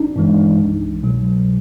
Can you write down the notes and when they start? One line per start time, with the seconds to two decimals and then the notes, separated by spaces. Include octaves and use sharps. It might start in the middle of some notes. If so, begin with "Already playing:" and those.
Already playing: G1 D4 D#4
0.16 G2 E3 G#3 D4
0.59 C2
1.03 B2 F#3